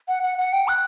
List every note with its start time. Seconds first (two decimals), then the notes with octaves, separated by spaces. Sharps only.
0.08 F#5
0.23 F#5
0.38 F#5
0.53 G5
0.68 F#6